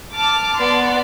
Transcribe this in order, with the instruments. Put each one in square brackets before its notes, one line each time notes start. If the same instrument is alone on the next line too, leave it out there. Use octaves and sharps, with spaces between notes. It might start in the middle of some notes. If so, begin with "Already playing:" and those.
[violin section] A5 D6 F6
[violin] B3 D5 [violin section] C6